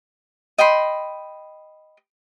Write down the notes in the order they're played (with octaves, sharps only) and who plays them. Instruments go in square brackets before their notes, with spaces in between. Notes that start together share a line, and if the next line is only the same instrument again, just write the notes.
[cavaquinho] D#5 G5 B5 C6